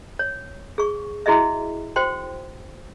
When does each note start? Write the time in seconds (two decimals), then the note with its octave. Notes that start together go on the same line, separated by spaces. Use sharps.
0.19 C#5
0.78 G#4 C#6
1.26 E4 F#4 G#4 D#5 E5
1.96 F#4 C5 G5 C6